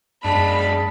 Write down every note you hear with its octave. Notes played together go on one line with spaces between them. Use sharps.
F#2 G#3 D4 A5 B5